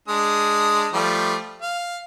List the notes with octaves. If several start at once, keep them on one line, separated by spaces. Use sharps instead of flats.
G#3 D4 D#6
F3 G3 A3
F5